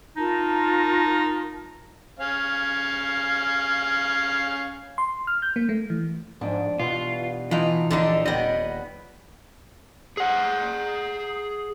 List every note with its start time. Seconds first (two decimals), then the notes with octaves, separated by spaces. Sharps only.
0.17 D#4 F4 A#4 A5
2.19 C#4 F5
4.98 C6
5.27 F6
5.42 G6
5.56 A#3
5.69 A3
5.90 E3
6.41 F2 G#2 D4
6.80 G2 B2 E3 G3 F4
7.51 A2 E3 D#4 F4
7.91 A#1 D3 D4 D#4
8.26 D#1 G3 B3 C#5 D#5 F#5 G5
10.17 G#4 F#5